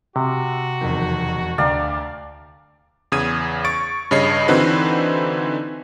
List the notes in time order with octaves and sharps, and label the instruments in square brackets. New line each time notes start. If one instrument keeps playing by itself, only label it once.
[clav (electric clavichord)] C3 [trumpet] F#4
[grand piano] E1 F2 D#3
[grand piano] D2 G5 A#5 [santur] D5 F5 A5
[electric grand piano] E2 C#3 D#6 G#6 D#7
C#6 A6 D7
G2 C#3 C#5 D#5 C7
D3 E3 C4 D#4 F#4 B4